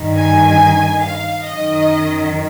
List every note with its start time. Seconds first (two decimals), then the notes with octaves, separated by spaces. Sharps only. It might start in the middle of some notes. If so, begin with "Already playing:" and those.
Already playing: G2 D#3
0.17 G#5
1.04 F5
1.46 F#2 D#3 D#5